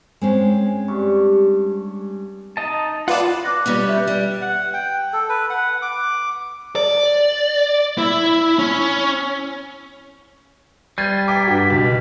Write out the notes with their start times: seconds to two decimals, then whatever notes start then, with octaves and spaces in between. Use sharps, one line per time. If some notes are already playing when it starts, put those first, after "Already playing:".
0.21 G#3 C4 C#4
0.88 G2 C#6
2.57 D#4 D#5 A5
3.08 F4 B4 D5 F#5 A5
3.44 D6 F#6 A#6
3.66 G3 B3 C#4
3.88 E5 F#6 G6
4.07 G3
4.42 F#5
4.74 G5
5.13 A4
5.29 B4
5.50 F#5
5.82 D6
6.76 D5
7.98 E4
8.59 C#4
10.98 G3 G#6 A6 C7 D#7
11.28 G5 A#5 D6 B6
11.48 G2 F#4
11.70 C#2 B2